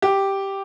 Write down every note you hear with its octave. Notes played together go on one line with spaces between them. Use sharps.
G4